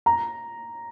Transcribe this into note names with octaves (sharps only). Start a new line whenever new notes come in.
A#5